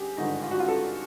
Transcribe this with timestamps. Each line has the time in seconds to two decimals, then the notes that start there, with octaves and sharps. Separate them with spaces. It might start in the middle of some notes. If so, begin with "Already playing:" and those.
Already playing: G2 D3 G4 G#4
0.17 G#1 G2 D3 F3 D#4
0.43 F4
0.51 F#4
0.60 F4
0.68 A4